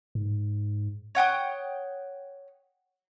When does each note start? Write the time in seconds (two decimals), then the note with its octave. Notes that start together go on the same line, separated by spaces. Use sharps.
0.15 G#2
1.15 C#5 F#5 G5 D#6